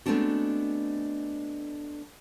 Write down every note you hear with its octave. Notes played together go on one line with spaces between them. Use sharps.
G#3 A3 B3 C4 D4 F#4